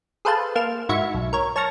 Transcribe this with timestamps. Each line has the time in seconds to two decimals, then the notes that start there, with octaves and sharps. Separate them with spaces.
0.25 G#4 A4 B4 C5 F5 A5
0.55 A#3 F5 F6 E7
0.89 G#2 E4 F#4 E5 G#6 C#7
1.15 B1
1.33 A#4 C#5
1.56 C#5 A5 C#6 F6 A#6